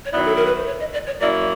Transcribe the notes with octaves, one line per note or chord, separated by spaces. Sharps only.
C#5
D#3 F#3 B3 E4 D5
A4
A#4
B4
C5
C#5
D#5
D5
C#5
F#3 A#3 C#4 E4 D5